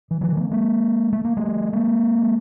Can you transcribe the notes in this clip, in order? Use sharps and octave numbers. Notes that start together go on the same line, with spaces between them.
E3
D#3 F3
A3 B3
G#3 A#3
A3
A#3
G3 A3
G#3 A#3
G#3